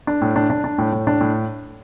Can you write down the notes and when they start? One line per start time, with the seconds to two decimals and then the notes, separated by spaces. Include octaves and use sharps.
0.07 D4
0.22 A2
0.36 D4
0.50 D4
0.64 D4
0.78 A2
0.92 A2
1.07 D4
1.21 A2